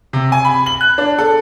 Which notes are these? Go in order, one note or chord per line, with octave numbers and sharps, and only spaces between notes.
C3
G#5
B5
F#7
F#6
D4
A4